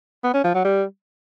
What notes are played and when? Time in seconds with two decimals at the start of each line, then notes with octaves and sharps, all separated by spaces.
0.24 B3
0.34 C#4
0.44 F3
0.54 F#3
0.65 G3